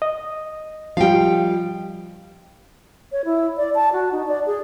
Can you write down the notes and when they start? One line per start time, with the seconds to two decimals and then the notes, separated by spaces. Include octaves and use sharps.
0.02 D#5
0.97 F3 G3 F5 G5
3.12 C#5
3.25 E4
3.57 D5
3.75 A5
3.93 F#4
4.12 D#4
4.28 D5
4.46 G#4